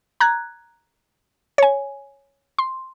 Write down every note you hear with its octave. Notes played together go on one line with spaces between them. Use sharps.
A#5 F#6 G#6
C#5 G#5
C6